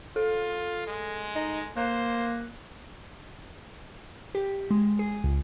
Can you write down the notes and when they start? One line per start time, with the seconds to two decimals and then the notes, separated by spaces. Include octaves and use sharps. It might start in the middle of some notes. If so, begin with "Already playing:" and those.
0.16 F4 A4
0.87 G#3
1.35 D#4
1.77 A#3 C5 F#6
4.35 G4
4.70 G#3
4.99 G#4
5.24 C#2